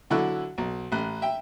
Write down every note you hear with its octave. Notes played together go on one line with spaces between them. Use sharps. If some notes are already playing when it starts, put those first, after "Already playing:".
B2 D3 F#3 E4 C#6 F#6
B1
A1 F#6
E5 G5